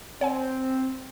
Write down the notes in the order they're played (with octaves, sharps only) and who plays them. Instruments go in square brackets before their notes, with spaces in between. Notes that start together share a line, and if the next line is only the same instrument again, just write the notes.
[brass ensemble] C4 [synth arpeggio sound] C#5 F#5 G#5